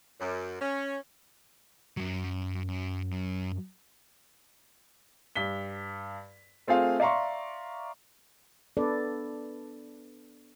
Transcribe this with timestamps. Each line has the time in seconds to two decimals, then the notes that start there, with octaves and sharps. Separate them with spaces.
0.20 F#2
0.61 C#4
1.97 F#2 F#3
5.36 G2 B6 G7
6.67 A3 C4 F4 G#4 F5
7.00 D5 E5 F5 A#5 C6 C#6
8.77 B3 D4 A4 B4 D5